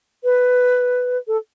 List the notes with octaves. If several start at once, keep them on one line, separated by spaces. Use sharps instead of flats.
B4
A4